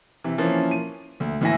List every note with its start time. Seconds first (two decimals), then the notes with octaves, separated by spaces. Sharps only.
0.24 C3 E3
0.38 E3 F3 A#3 C#4 F4
0.71 D#7
1.20 D2
1.41 D2 A2 E3 E5 G#5 A#6